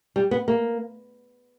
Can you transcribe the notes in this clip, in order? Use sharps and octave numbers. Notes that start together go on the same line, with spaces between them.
G3
B3
A#3